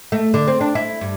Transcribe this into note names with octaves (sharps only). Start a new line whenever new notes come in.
A3
D3
C4
D4
E4
G2